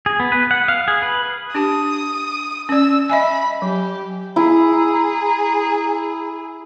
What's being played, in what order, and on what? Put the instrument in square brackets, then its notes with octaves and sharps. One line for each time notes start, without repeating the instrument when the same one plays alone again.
[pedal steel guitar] G#4
B3
B4
F#5
F5
G#4
B4
[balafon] D4 G4 A5 [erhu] D#6
[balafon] C#4 D5 [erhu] E6
[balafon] D#5 E5 G#5 [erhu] B5
[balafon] F#3 [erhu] G4
[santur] E4 [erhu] G#4 [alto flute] A#5